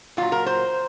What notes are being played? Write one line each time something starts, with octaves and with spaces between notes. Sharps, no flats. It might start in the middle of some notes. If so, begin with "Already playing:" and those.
A#2 F#3 F4
A#4
C5